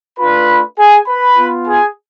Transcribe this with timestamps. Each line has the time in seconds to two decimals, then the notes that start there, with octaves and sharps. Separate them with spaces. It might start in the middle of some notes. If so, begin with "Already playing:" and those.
0.19 A3 D4 F4 B4 B5
0.79 G#4 G#5
1.07 B4 B5
1.37 B3 F4
1.67 G#4 G#5